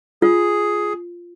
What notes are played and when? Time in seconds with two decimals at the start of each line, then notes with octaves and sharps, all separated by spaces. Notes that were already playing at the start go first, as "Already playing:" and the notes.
0.22 F4 G#4